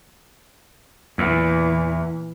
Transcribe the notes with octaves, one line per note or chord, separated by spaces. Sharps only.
E2 A#2 E3